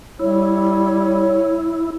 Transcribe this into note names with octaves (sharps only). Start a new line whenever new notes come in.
G3 E4 C#5